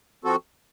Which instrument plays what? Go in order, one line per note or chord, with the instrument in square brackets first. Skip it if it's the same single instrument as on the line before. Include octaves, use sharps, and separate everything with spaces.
[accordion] F3 C4 F#4 A4